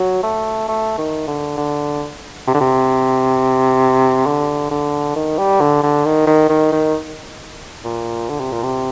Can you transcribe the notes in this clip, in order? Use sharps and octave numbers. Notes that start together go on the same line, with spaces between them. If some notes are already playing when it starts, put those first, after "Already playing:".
Already playing: F#3
A3
A3
D#3
D3
D3
C3
D3
C3
D3
D3
D#3
G3
D3
D3
D#3
D#3
D#3
D#3
A#2
D3
C3
A#2
C3